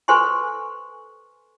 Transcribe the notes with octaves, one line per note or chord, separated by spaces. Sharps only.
A4 B4 C5 G#5 C6 C#6